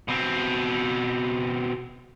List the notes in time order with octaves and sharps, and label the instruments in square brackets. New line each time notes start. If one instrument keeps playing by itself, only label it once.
[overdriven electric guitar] B2 C4